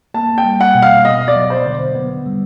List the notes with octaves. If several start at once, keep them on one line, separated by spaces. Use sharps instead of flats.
A#3 A5
G5
G3
F#5
B2
F5
B3 D#5
D5
F#3
C5
D3
B3
G3